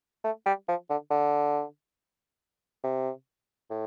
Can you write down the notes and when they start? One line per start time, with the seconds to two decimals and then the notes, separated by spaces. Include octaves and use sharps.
0.24 A3
0.46 G3
0.68 F3
0.90 D3
1.11 D3
2.84 C3
3.70 A2